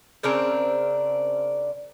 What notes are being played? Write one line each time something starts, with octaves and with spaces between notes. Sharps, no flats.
C#3 C4 D4 A#4